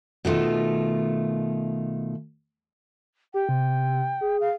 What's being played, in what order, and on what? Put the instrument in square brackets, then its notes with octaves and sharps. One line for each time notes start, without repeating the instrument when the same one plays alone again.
[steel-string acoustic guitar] B2 D#3 A3 F4
[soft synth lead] G4 [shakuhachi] G5
[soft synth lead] C3
G#4
[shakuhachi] F5